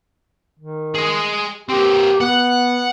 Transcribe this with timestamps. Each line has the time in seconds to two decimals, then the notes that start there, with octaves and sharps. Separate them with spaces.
0.59 D#3
0.94 G#4 D#5
1.69 A#3 C4 G4
2.21 B3 F#5